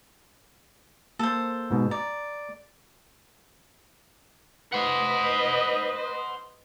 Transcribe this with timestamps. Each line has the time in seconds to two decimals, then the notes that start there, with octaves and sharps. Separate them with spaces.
1.19 A#3 A4 C5
1.71 G#2 B2
1.91 D5 A#5
4.72 B4 C5 D#5 F#5